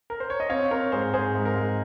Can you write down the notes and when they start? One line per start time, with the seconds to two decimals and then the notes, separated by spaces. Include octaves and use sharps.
0.10 A#4
0.20 C5
0.30 C#5
0.40 D#5
0.50 C4 C#5 F5
0.71 C4 A#4 C#5
0.92 G#2 G#4 C5
1.14 G#2 G#4 C5
1.35 G#2
1.45 A#4
1.56 G#2